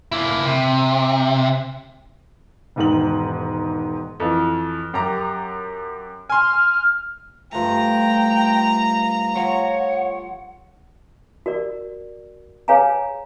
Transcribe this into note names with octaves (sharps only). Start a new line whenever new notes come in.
A#3 E4
C3
E1 G#2 D#3 F#7
F2 E3
F#2 G4 A#5
G#5 C6 F6
G2 F3 A3 G5 A#5
F3 C#5 F#5
F#4 A#4 D5
G#4 B4 C#5 F5 G#5 A#5